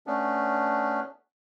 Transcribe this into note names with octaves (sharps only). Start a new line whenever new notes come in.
A3 B3 C#4 D4